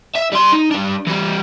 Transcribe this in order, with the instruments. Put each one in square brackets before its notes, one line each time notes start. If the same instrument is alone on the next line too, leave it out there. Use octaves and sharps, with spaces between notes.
[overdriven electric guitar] E5
G3 C6
D#4
G3 D4
E3 G3